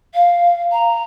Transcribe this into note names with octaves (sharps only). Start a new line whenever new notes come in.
F5
A#5